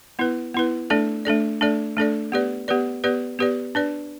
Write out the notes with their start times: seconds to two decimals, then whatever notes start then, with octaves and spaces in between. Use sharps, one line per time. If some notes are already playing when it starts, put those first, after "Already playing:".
0.19 B3 E4 B4
0.54 B3 E4 B4
0.90 A3 D4 A4 D5
1.25 A3 D4 A4 D5
1.61 A3 D4 A4 D5
1.97 A3 D4 A4 D5
2.32 B3 G4 B4 D5
2.68 B3 G4 B4 D5
3.04 B3 G4 B4 D5
3.39 B3 G4 B4 D5
3.75 D4 B4 D5